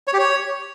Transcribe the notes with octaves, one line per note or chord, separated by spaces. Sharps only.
C#5
G4
C#5